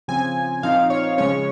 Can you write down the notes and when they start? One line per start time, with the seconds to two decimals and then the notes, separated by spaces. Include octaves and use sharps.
0.08 C#3 F3 C4 G#5
0.63 A#2 F3 C4 D#4 F5
0.90 C#5
1.18 C#3 F3 G#3 C#4 C#5